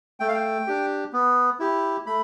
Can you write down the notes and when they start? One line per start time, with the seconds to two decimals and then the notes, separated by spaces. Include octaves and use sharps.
0.20 A3 G5
0.28 F5
0.35 G5
0.67 D4 G4
1.13 B3
1.59 E4 G4
2.06 A3 B5